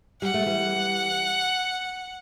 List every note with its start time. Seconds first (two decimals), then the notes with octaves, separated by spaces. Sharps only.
0.22 G3 F#5
0.34 A3
0.46 E3 G3